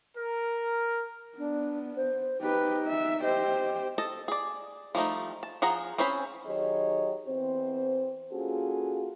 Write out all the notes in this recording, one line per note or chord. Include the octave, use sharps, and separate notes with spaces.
A#4
B3 D4
C5
D#4 G4 B4
E5
G4 C5 D#5
A4 D#5 A5
G#4 D5
F3 G3 A3 D#4
A5
F3 G#4 F#5 A#5
C4 C#4 G#4 C5 B5
D#3 F#3 G4 G#4 C#5 D#5
E2 C4 C5
A#3 C#4 F4 F#4 G#4 A4